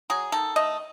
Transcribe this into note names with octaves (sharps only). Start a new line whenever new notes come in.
F#3 G#4
D#3 A4
A3 D#5